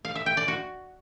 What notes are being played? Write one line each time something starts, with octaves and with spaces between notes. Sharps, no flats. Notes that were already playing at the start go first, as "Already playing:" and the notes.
F5
E5
G5
D5
F#4